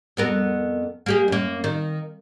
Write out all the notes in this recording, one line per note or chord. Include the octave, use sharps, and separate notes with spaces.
F2 B3 A#4
A#3 G4 G#4
F#2 A#3
D#3